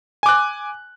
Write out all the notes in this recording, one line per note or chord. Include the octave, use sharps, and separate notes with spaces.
G#5 D6 F#6